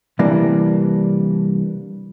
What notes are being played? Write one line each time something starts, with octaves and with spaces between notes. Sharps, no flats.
C3 E3 G3 A#3 D4